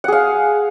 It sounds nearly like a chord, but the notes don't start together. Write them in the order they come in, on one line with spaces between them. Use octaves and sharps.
F#5 G#4 F5